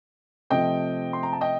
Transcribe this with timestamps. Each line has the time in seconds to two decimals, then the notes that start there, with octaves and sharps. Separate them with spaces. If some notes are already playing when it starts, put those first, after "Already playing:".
0.50 C3 F3 A3 C4 D#5 G5
1.13 C6
1.23 A#5
1.33 A5
1.41 D#5 G5